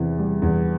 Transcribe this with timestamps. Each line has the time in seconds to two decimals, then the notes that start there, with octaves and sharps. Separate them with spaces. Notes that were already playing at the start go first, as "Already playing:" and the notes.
Already playing: E2 C3 E3
0.19 G3
0.42 E2